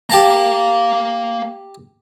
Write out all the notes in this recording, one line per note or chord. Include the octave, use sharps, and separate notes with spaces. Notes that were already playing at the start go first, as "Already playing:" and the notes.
A#3 G4 F5 A5 A#5